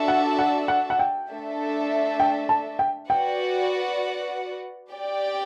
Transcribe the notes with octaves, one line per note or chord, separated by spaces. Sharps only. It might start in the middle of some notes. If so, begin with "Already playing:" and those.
Already playing: D4 F#4 A4 E5 A5
F#5
F#5
F#5
F#5
G5
A3 D4 A4 E5
G5
A5
G5
F#4 B4 D5 F#5 G5
G4 D5 G5